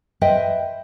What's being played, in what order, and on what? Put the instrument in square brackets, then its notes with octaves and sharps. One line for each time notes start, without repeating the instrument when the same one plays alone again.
[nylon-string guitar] B4 C5 D#5 E5 G5